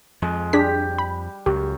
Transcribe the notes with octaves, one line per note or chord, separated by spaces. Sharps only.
F2 F3 G#3
G3 D4 G4 G#4 B6
B5
C#2 F#2 G4